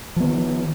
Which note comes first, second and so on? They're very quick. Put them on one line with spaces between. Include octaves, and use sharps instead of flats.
F3 B3 D#3